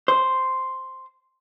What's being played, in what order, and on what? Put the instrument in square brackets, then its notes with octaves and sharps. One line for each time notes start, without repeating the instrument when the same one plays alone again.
[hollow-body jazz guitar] C5